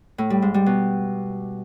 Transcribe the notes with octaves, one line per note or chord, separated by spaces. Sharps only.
A2
G3
G#2
G3
B2